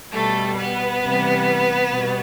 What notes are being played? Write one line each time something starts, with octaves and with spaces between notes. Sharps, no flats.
B2 G3 A3 A4
B3 B4
C3 E3 G3
B2 G3